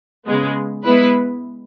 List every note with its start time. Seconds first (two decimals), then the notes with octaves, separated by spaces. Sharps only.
0.26 C#3 G#3 B3
0.84 G#3 B3 E4 B4